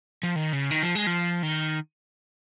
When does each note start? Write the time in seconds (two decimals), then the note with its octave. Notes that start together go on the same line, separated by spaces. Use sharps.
0.23 F3
0.36 D#3
0.53 C#3
0.71 D#3
0.83 F3
0.95 G#3
1.07 F3
1.43 D#3